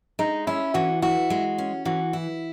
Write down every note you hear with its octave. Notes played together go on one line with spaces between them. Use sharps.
G#3 D#4
C#4 E4
E3 F#4
E4 F#4
G#3
C#4
E3 F#4
E4